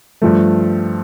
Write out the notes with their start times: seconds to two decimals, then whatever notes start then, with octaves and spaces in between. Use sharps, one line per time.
0.22 G2 F3 A3